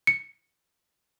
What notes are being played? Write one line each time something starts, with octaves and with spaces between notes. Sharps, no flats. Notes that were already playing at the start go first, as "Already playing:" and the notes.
C#7